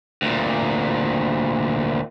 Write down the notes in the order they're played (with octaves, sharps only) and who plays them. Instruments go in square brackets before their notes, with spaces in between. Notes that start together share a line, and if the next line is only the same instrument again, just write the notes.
[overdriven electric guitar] D2 A#2